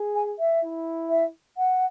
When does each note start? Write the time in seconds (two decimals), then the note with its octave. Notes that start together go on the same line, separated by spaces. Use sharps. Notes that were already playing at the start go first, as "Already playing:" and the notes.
Already playing: G#4
0.15 G#5
0.39 E5
0.63 E4
1.10 E5
1.58 F#5